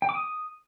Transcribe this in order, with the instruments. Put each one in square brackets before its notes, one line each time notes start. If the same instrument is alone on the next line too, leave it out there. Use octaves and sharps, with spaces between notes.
[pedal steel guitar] G5
D6
D#6